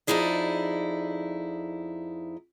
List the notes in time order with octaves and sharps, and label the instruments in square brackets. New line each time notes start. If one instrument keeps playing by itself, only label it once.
[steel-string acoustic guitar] F2 G#2 D#4 E4 G#4 D5